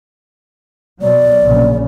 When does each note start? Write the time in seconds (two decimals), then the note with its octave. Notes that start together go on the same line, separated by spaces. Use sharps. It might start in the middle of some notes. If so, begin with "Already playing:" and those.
1.02 B2 F#3 D5
1.43 A#1 C#3